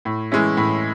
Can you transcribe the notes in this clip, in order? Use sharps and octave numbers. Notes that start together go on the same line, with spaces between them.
A2
E3 G#3 C#4 E4
A2